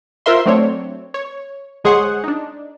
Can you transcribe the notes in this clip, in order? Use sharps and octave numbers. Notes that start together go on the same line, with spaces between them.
F4 A#4 C5 E5 C6
F#3 A3 C4 D4 C#5
C#5
G1 G#3 G#4 C5 C#5 F#5
D4 D#4